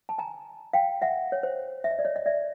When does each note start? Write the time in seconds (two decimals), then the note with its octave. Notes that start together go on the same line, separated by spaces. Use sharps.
0.09 A5
0.18 G#5 A#5
0.73 F5 G5
1.02 E5 F#5
1.32 C#5
1.43 C5
1.84 E5
1.91 D#5
1.99 D5
2.05 C#5 D#5
2.16 D#5
2.26 D5 E5